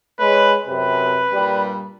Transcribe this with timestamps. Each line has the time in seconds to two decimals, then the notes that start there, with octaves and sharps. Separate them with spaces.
0.19 G#3 B4 C#5
0.67 F#2 C3 B4
1.32 G2 A#2 G3